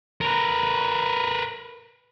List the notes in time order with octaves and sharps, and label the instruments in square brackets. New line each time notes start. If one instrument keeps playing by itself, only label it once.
[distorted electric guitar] A#4 B4